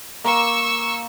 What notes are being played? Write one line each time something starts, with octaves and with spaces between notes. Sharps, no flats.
A#3 C#6 E6